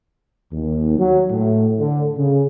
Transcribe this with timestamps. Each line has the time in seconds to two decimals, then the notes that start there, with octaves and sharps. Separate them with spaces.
0.53 D#2
0.99 F#3
1.31 A2
1.79 D3
2.17 C#3